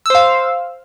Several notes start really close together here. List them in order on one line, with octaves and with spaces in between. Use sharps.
E6 C5 F5